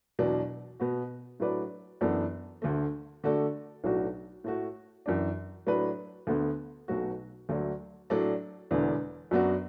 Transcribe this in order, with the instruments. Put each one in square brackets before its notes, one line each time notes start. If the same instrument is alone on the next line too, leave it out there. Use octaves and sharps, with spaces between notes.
[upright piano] E2 B2 F#3 D4
B2 B3 F#4
A2 F#3 D4 B4 D5
F#2 E3 B3 D4 A4
D2 D3 A3
D3 A3 F#4 A4 D5
B1 A2 F#3 D4 F#4
A2 A3 F#4
F#2 E3 D4
A2 F#3 D4 B4
D2 D3 B3
B1 B2 F#3 A3 F#4
D2 D3 F#3 A3 D4
A2 F#3 D4 A4 D5
E1 E2 D3 B3 D4
F#2 F#3 B3 D4 F#4